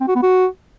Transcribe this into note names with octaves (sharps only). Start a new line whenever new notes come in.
C4
F#4
B3
F#4